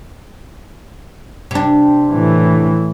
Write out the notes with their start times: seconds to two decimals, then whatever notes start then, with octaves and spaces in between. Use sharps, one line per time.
1.51 C3 D4
2.12 A2 E3